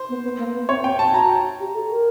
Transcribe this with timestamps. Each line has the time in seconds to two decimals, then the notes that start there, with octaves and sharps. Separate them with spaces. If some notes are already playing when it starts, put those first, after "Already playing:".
Already playing: C5
0.09 B3
0.24 B3
0.38 A#3
0.53 B3
0.69 C4 C#5
0.84 G5
0.99 A5
1.14 F#4 A#5
1.60 G4
1.74 A4
1.90 A#4